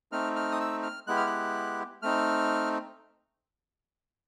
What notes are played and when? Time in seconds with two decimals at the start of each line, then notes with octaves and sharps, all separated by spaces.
0.12 A3 C4 D#4 F6
0.36 F6
0.52 D#6
0.60 E6
0.83 F6
1.07 G#3 B3 E4 G4 F#6
1.17 F6
1.26 F#6
2.02 A3 C4 D#4 F6